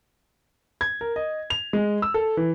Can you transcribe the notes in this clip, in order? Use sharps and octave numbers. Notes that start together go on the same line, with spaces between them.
G#6
A#4
D#5
F7
G#3
E6
A4
E3